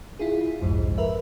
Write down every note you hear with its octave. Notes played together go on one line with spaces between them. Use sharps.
E4 F4 G#4
G1 C2 F2 G#2
A#4 B4 E5